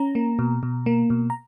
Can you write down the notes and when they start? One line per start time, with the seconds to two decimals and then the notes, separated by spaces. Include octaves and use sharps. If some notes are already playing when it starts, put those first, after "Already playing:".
Already playing: C#4 A#5
0.15 A#3
0.39 B2
0.63 B2
0.86 A#3
1.10 B2
1.30 A#5